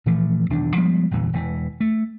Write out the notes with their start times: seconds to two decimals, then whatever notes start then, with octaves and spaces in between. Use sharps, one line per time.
0.06 A#2 E3 F3 A3
0.50 B1 E2 D#3 D4
0.76 F3 G3 G#3 B3
1.11 G1 E2 A#2 E3
1.33 E1 E3
1.81 A3